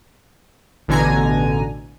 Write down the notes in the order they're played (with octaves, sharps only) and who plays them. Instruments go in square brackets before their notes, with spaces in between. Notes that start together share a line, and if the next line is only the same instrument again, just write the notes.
[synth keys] A1 B2 D3 G#5 A#5